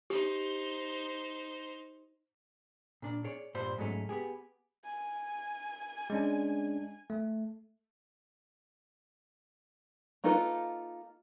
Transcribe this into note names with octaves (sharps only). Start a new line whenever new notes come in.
D#4 G4 C5
A#2 D4
G#4 C#5 D5
G2 A#2 G3 C5 C6
G#2 F#3 A3 C#4
B3 G4 G#4
G#5
G#3 C#4 D4
A3
A#3 D#4 F4 A4 B4